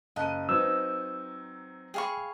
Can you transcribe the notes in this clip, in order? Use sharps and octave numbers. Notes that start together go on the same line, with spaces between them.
F#1 D#5 F5 A5 F#6 D#7
F#3 C4 D#4 B4 C5 D#6 E6
G#4 F5 G5 B5 C#6